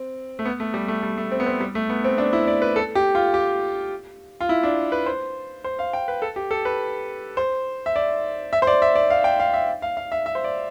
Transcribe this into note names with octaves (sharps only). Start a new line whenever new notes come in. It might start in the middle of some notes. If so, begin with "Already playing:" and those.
Already playing: C4
A3
B3
A3
G3
A3
G3
A3
C4
B3
C4
G3
A3
B3
C4
D4
E4
D5
B4
A4
G4
F4
G4
F4
E4
D4
B4
C5
C5
F5
G5
B4
A4
G4
A4
B4
C5
E5
D5
E5
C5
D5
E5
D5
F5
G5
F5
E5
F5
F5
E5
E5
C5
D5